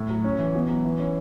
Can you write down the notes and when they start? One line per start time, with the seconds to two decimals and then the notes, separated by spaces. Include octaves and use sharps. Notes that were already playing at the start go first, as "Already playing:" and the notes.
Already playing: A2
0.10 F#3
0.24 C#4
0.39 E3
0.55 B2
0.69 F#3
0.85 E3
1.00 C#4